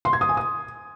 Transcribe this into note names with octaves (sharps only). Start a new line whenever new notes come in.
C6
G#6
D#6
G#5
D#6